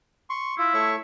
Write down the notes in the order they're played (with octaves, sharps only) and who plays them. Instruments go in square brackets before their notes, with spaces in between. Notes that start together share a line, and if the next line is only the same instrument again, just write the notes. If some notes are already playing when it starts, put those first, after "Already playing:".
[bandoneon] C6 C#6
[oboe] E4 [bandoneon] F4
[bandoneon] A3 C#5 C#6